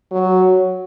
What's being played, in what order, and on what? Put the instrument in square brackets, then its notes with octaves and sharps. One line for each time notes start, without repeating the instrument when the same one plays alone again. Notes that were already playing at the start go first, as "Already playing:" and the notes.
[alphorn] F#3